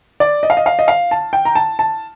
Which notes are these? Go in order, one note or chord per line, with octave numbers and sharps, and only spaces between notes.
D5
D#5
F5
D#5
F5
D#5
F5
A5
G5
A#5
A5
A5